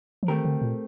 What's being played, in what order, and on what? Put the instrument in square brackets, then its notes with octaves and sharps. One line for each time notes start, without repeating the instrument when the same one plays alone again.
[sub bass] F3
[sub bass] D#3 [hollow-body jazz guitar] A3 C4 G4 A#4
[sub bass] D3
A#2